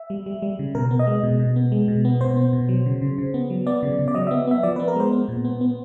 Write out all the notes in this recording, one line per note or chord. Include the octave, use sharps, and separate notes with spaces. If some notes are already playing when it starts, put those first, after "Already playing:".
Already playing: E5
G3
G3
G3
C#3
B2 A#4
B3
D#5
G#3
B2
B2
B3
G#3
B2
B3
B2 C5
B3
B2
F#3
C#3
C#3
C#3
B3
F#3
B3 D5
C#3
C#3
D5
F#3 D#5
E5
B3
B3 E5
F3 D5
B4
B3
A#4
G#3 C5
B3
A#2
B3
B3